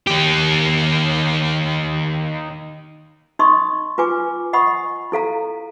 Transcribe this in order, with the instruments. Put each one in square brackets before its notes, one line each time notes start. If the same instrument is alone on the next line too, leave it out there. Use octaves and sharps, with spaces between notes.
[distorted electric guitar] D#3 G4
[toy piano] D#4 D#5 C6 C#6 D#6
F4 B4 G#5 D6
D#5 F#5 B5 C#6 D#6
E4 A4 F5 A#5